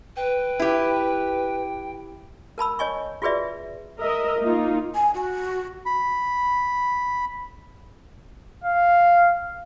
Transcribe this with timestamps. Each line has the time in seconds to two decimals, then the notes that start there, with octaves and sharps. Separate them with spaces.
0.16 B4 G5
0.60 E4 G4
2.58 A#4 A5 B5 E6
2.79 C#5 D#5 G#5 C#6
3.22 F4 F#4 G#4 B4 D5 E5
4.01 A#4 D#5 E5
4.42 A#3 D#4 F4
4.95 G#5
5.14 F#4
5.86 B5
8.64 F5